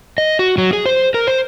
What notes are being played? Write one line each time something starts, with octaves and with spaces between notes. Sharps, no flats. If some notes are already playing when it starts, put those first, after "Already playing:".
D#5
F#4
F#3
G#4
C5
A#4
C5